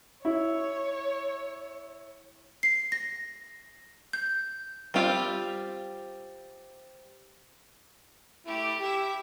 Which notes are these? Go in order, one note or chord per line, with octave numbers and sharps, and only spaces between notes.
E4 C#5
C7
A#6
G6
G3 C4 F4 G4
A3 E4 G4
E4 G4 E5